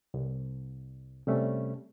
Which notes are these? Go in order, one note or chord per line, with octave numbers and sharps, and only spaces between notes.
C2
C3 G3 A3 C#4